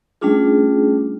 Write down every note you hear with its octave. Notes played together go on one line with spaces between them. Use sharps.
G3 A3 C#4 D4 F4 G#4